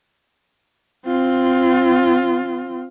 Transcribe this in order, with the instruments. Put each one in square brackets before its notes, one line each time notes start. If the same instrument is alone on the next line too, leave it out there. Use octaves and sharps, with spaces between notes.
[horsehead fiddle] C4 F4